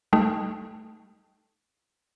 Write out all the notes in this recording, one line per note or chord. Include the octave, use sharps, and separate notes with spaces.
G3 A3 D#4